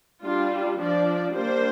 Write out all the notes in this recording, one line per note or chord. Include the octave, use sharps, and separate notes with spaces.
G3 D4 F4
F3 D4 D5
G3 A#3 D4 C5